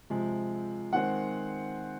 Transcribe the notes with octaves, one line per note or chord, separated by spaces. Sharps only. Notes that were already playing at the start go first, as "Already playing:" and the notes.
C3 F3 G#3
D#3 G#3 C4 F#5